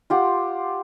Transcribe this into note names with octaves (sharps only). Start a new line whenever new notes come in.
F4 G4 F#5